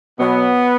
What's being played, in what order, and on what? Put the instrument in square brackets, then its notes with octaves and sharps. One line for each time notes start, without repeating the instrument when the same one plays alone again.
[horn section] B2 F#3 B3